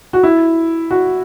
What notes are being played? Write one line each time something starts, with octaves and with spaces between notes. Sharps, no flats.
F#4
E4
F#4